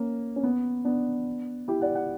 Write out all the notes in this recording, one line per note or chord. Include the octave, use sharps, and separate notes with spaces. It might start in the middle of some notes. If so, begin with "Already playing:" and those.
Already playing: A#3 C#4
C#4
B3
B3 D4
E4 G4
D5 F#5
F#5